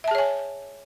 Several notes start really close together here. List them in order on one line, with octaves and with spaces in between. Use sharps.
E5 A5 G#4 C#5 G#5